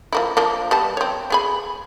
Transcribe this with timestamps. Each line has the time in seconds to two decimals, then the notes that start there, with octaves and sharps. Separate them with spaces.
0.12 F3 A#3 E4
0.37 F3 A#3 D4
0.71 G3 B3 A5
0.97 C4 C#5
1.30 B3 G#4 B5